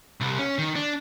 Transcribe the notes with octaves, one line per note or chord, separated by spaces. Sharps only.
C2
C#4
D#3
D4